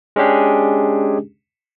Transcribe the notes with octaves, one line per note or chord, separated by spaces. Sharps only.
G#3 C#4 D4 G4 G#4